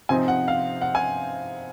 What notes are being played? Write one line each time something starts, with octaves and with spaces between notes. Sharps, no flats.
C3 F3 C4 D#4 G#5
F#5
F5
F#5
G#5